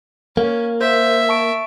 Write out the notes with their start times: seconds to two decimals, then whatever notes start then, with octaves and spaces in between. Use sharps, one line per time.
0.37 A#3 C#4
0.81 C5 E5
1.29 A5 C#6 D7